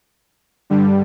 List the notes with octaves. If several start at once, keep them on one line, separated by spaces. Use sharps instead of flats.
G2 D3 G3